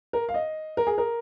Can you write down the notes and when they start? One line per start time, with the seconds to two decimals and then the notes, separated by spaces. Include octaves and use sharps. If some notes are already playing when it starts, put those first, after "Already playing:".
0.13 A#4
0.29 F5
0.34 D#5
0.77 A#4
0.87 G#4
0.98 A#4